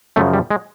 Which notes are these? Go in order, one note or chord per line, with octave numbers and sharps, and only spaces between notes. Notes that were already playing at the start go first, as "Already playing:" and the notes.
F#2 C#3 F3 A3
G3
G#3